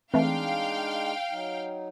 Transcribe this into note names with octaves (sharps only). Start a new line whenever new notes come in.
E3 G#3 A3 C4 D4 D#4 F5 G5
F#3 D#4